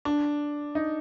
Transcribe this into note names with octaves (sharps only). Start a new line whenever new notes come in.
D4
D#4